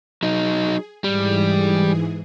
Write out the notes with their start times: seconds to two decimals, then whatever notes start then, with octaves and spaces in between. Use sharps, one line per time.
0.23 F#3 D#4 G#4
1.04 G#2 E3 G3 G#4